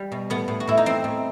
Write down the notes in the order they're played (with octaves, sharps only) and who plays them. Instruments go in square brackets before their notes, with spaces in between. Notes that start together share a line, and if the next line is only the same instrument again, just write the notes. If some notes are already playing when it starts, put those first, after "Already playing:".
Already playing: [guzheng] G3
B2
A2 B3
A2
F#4
A2 E4
D#4
E3 C4
A2